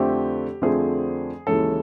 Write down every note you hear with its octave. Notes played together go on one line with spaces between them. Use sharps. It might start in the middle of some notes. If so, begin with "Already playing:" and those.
Already playing: F2 D3 F3 A3 C4 G4
F2 D3 F3 A3 C4 G#4
D#2 C#3 E3 G#3 C#4 A4